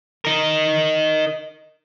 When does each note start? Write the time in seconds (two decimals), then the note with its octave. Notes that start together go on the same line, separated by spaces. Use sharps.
0.25 D#4 A#4